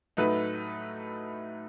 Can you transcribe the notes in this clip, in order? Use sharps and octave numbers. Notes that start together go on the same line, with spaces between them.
A2 F#3 A3 D#4 B4